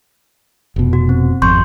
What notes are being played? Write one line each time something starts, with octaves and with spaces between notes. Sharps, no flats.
F1 B2
F#4
C4
G#1 F2 C6 C#6 G6